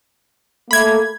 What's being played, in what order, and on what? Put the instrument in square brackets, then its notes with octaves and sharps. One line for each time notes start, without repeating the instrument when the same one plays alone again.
[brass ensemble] A3 A#3 [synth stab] B5 G#6